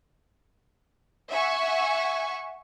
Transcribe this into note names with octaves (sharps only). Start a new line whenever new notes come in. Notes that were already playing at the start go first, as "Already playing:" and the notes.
E5 F#5 G#5 C#6